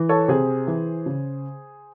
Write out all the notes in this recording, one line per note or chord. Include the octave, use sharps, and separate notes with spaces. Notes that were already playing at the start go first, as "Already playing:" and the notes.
Already playing: E3
A4 C#5
C3 G#4 C5
E3
C#3